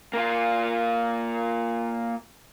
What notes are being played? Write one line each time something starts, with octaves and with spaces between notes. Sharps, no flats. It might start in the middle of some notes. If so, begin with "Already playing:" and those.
A#3 F4